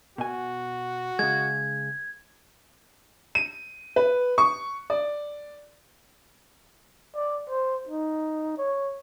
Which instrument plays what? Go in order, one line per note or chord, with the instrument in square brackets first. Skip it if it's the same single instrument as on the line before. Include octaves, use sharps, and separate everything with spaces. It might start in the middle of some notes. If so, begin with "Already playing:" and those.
[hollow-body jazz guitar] B2 G#5 [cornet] F#4
[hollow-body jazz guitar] C#3 G#3 [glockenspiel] G#6
[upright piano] D#7
B4
C#6
D5
[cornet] D5
C5
D#4
C#5